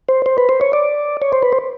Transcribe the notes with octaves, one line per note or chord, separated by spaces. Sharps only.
C5
C5
B4
C5
C#5
D5
C#5
C5
B4
C5